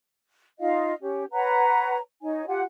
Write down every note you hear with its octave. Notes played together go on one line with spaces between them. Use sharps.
D#4 F4 D#5 F5
C#4 G4
B4 C#5 F#5 A#5
D#4 C#5 G#5
F4 G4 F#5 G#5